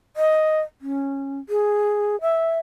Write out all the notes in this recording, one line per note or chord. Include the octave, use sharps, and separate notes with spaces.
D#5
C#4
G#4
E5